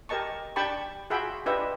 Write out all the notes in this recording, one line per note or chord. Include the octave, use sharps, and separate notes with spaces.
G4 A#4 D#5 A5 C#6
D4 G4 G5 A5 B5 C#6
F4 F#4 G#4 E5 G5 B5
D4 F4 G4 B4 D#5 E5